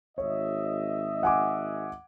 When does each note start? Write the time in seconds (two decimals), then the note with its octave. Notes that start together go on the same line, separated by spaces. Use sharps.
0.18 G#1 C#5 D#5 E5
1.23 F#5 G#5 D6